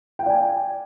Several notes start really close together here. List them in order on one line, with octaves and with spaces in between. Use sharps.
G5 F5 D5 G#5